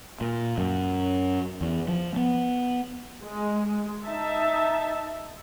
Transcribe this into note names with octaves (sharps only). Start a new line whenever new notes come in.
A#2
F#2
E2
F3
B3
G#3
D#4 E5 A5